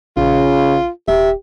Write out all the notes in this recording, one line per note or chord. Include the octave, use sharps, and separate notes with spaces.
A#1 C#3 F4
D#1 G4 E5